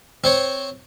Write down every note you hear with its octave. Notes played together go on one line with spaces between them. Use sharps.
C4 C5 C#5